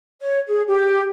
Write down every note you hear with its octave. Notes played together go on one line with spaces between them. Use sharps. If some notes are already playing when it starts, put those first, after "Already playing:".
C#5
G#4
G4